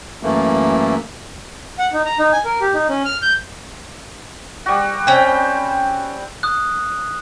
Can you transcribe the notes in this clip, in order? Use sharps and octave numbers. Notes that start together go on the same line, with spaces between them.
F#2 E3 A3 A#3
F#5
D#4
A#5
D#4
G#5
A#4
G4
D#4
C#4
F6
G6
G3 F#4
C4 C#4 G5
D#6 F#6